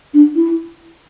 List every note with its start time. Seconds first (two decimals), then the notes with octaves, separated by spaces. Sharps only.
0.14 D4
0.36 E4